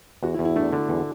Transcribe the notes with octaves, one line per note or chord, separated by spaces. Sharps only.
E2 F#4
E4
E2
E4
A3 D4
D3
E2